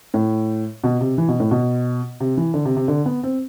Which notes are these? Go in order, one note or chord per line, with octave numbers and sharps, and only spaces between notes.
A2
B2
C3
E3
B2
A2
B2
C3
E3
D3
C3
C3
D3
B3
C4